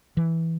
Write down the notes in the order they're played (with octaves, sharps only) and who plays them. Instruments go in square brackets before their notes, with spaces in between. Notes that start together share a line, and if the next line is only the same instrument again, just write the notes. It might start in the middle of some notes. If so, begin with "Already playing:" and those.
[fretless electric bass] E3